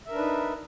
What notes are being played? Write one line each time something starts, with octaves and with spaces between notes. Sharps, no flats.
D4 D#4 A#4 B4 E5